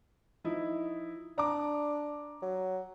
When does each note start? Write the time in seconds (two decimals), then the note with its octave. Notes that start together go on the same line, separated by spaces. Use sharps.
0.44 F3 D#4 E4
1.38 D4 A#5 D6
2.42 F#3